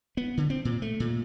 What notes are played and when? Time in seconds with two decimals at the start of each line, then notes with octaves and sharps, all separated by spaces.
0.17 B3
0.37 D3
0.50 C4
0.65 A#2
0.82 A3
1.00 A#2